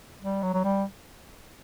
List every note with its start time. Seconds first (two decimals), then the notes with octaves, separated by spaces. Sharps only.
0.21 G3
0.42 F#3
0.54 F#3
0.64 G3